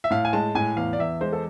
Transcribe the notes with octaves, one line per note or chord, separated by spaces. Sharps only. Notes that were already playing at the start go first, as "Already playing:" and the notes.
E5
A2 F5
G#5
G#3 A5
A2 G#5
E2 F5
D5
E2 E5
G#3 C5
A4